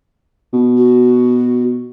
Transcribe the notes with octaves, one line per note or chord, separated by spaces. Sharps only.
B2
F#4